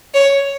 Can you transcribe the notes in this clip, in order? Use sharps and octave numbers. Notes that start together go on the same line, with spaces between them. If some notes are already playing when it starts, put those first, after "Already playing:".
C#5